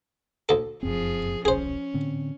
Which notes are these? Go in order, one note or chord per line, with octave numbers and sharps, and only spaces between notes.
D2 A4
F1 F#2 F3 C4 G#4
D#1 B1 C#4 G#4 C5
A2 D3 C4